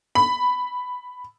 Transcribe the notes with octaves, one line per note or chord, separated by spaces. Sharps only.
B5